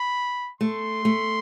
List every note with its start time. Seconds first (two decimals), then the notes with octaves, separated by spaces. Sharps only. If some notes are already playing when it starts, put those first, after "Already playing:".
Already playing: B5
0.61 A3 C6
1.05 A3